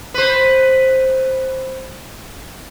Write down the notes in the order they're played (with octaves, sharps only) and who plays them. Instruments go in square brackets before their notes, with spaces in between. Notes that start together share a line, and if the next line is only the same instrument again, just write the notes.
[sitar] B4 C5